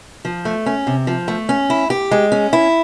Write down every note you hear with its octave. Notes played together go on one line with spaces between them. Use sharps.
F3
A3
C#4
C3
F3
A3
C#4
E4
G4
G#3
C#4
E4